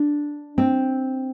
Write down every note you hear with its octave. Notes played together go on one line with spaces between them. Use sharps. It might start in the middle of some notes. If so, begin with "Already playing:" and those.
Already playing: D4
C4